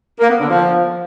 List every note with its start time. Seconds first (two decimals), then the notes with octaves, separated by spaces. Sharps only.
0.20 A#3
0.29 B3
0.39 D3
0.49 F3